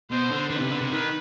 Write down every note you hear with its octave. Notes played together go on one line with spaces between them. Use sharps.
B2 C5
D3
D3 B4
B2
C3
D3
C3
D#3 B4